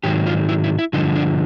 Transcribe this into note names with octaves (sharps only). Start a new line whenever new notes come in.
G#2 D#3 F#3 G4
F4
E4
E4
E4
G2 D3 F3 D#4
D4